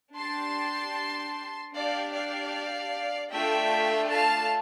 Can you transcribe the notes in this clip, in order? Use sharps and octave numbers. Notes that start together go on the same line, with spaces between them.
D4 G4 A5 C6
D4 G4 D5 F5
D5 F5
A3 D4 F4 A4 E5 G5
F5 A5